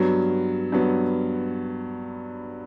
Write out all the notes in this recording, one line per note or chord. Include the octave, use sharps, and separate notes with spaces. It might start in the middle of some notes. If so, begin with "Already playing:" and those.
Already playing: G2 F#3 B3
G2 F#3 B3